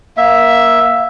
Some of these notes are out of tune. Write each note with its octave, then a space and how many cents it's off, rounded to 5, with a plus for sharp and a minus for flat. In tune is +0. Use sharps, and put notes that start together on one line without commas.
A#3 +20 E5 +0